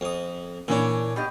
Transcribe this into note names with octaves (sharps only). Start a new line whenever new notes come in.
F2 D#6
A#2 E3 C#4 D4 C#5
B2 G4 D#5